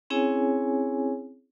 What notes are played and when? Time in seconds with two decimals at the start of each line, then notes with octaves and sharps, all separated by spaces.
0.10 C4 C#4 E4 G#4 C#5 G#5